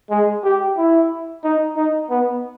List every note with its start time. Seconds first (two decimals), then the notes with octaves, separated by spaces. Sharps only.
0.10 G#3
0.43 G4
0.77 E4
1.44 D#4
1.77 D#4
2.10 B3